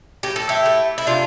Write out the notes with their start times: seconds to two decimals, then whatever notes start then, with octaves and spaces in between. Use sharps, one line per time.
0.23 A2 G4
0.36 A4
0.49 E4 G4
0.66 A3
0.98 E4
1.07 C3 D4 F4